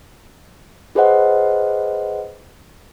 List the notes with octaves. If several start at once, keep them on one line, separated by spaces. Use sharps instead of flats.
F4 G#4 B4 C5 D#5 F#5